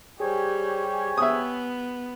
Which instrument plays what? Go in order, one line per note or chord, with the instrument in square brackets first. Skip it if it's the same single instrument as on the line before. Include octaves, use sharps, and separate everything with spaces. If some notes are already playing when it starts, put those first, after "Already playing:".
[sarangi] G3 [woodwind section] G4 C#5 G#5 [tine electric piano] G#4 C5
[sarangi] B3 [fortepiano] E5 D#6